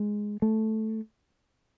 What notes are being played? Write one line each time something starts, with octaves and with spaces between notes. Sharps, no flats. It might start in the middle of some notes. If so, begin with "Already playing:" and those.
Already playing: G#3
A3